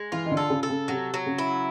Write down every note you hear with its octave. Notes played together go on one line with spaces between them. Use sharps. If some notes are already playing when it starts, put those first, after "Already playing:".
Already playing: G#3
E3 F4
D#3
D3
A4
C#3
A4
C#3
C3 F#3
F#3
C#3
E4